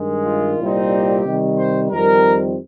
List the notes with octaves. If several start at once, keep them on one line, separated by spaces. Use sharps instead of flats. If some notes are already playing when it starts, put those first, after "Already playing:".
Already playing: G2 D#3 G#3
F4
C2 A#2 G3 C4 D#4
G4
C3 D#3 G3
C5
F2 D#3 G3 C4 A#4